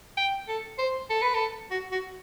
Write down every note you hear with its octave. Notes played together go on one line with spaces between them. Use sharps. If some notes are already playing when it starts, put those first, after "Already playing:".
G5
A4
C5
A4
B4
A4
F#4
F#4